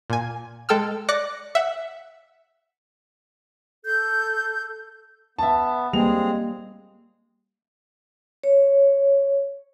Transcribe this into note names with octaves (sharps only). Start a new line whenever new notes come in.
A#2 G#5
G#3 A4 G5 E6 F6
D5 D6 F#6 A#6 C#7
E5 F#5
A4 G6
B3 E5 A5
G3 G#3 A#3 C4 G#4 F7
C#5